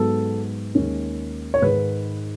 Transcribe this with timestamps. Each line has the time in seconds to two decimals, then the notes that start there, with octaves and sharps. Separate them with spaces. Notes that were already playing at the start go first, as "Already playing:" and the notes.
Already playing: G#2 F#3 B3 A4
0.75 D#2 D#3 G#3 C#4
1.54 C#5
1.62 G#2 D#3 G#3 B4